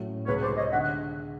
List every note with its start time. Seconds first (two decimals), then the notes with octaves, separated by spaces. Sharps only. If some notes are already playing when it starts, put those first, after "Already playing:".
Already playing: A2 F#3 A3 C#4
0.26 C#2 C3 D#3 G#3 B3 B4 C#5
0.42 C5 D5
0.57 C#5 D#5
0.71 D3 E5 F#5